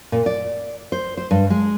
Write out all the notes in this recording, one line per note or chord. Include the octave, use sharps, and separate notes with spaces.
A#2
D5
C5
C5
G2
G#3